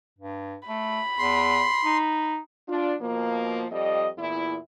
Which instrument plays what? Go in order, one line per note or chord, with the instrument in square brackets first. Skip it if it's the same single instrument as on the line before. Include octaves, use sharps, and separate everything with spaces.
[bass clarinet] G2
[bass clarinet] A3 [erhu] B5
[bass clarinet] E2 [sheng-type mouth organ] C6
[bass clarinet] D#4
[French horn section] D4 F4
B2 F3 A#3
F2 G3 D#5
E2 A#2 E4